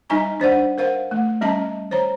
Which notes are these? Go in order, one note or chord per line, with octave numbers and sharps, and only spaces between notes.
G3 D#4 D#5 G#5 A#5 C#6
D4 C5 D5 F#5
A#4 C5 F5 F#5
A3
G3 C#4 D#5 A5 A#5
C5 C#5 A#5